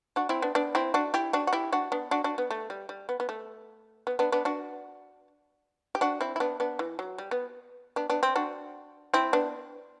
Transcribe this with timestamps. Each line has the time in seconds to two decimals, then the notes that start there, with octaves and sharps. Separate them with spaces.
0.16 D4 F#4
0.29 C4 E4
0.42 B3 D4
0.55 B3 D4
0.75 C4 E4
0.94 D4 F#4
1.14 E4 G4
1.33 D4 F#4
1.47 F#4
1.53 E4 G4
1.72 D4 F#4
1.92 B3 D4
2.11 D4 F#4
2.24 D4 F#4
2.38 B3
2.51 A3
2.70 G3
2.89 G3
3.09 B3
3.20 B3
3.29 A3
4.07 B3
4.19 B3 D4
4.32 B3 D4
4.45 D4 F#4
5.95 G4
6.01 D4 F#4
6.21 C4 E4
6.36 E4
6.40 B3 D4
6.60 B3 D4
6.79 E3
6.99 F#3
7.18 G3
7.31 B3
7.96 B3 D4
8.10 B3 D4
8.23 C4
8.36 D4 F#4
9.14 C4 E4
9.33 B3 D4